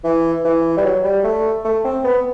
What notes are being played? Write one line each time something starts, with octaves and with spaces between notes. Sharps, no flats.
E3
E3
G3
F#3
G3
A3
A3
C4
B3